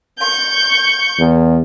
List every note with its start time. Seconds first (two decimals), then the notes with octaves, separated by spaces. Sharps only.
0.19 C#6 G6
1.19 E2